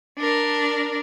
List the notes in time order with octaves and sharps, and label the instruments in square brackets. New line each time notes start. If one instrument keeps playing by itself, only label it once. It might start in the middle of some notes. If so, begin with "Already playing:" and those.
[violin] D4 A#4